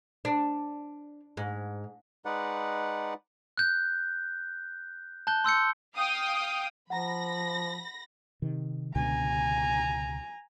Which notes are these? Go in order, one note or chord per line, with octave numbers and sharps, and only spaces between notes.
D4
G#2
G#3 D#4 B4 D5 F#5
F#6 G6
A5 F#6 G6 G7
C6 E6 G6 C#7
F5 G5 D#6
F3 F#5 A#5 B5 A#6
C3 D#3
C#2 B2 D3 G#5 A#5